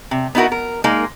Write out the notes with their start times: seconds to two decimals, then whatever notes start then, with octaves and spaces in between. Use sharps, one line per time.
0.11 C3
0.35 B3 D#4 E4 F#4 A#4
0.52 A#4
0.84 G#3 A#3 D#4 A#4